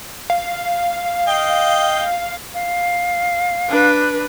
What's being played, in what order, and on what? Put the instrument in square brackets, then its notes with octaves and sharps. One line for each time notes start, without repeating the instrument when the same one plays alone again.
[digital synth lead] F5
[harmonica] D#5 G5
[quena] F5
[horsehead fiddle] D4 B4